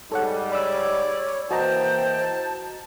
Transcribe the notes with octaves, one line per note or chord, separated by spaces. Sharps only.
G#2 G3 A4 C#5 F#5
C#5 D5 B5 D6 E6
E3 A#3 F#4 C5 D#5 G5 A5 A#5